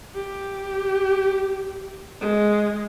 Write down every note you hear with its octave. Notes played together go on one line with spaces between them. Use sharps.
G4
G#3